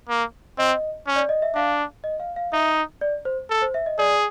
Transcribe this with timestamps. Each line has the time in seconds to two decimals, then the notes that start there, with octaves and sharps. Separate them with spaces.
0.09 A#3
0.58 C4 D#5
1.07 C#4
1.16 D5
1.29 D#5
1.42 E5
1.55 D4 F5
2.04 D#5
2.20 F5
2.36 F5
2.52 D#4 E5
3.01 D5
3.25 C5
3.50 A4
3.62 C5
3.74 E5
3.86 D#5
3.98 G#4 D5